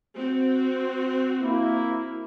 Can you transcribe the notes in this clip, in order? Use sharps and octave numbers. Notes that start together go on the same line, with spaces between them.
C4 F#4
A#3 E4